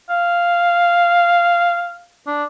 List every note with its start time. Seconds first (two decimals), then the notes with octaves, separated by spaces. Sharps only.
0.10 F5
2.27 D4